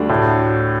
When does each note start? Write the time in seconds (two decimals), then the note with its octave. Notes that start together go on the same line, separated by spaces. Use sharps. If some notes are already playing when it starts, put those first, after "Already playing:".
Already playing: D2 D3 G3 D4 F#4
0.09 A2